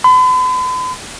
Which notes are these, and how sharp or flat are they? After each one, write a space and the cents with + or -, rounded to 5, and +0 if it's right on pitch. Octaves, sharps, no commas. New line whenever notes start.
B5 +45